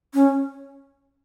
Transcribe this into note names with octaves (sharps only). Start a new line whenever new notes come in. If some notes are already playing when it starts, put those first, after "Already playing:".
C#4